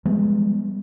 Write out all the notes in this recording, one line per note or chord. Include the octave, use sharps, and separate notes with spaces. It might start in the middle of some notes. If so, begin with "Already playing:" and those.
F3 G3 G#3 B3